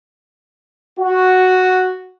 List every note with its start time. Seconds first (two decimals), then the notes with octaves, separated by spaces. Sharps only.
0.99 F#4